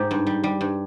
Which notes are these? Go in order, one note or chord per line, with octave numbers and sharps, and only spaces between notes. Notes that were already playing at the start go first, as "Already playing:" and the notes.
Already playing: G#2 G4
G2
G3
G3
G2